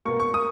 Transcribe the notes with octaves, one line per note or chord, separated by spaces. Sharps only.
B2 A#3 C#6
C#6
A#3 D#6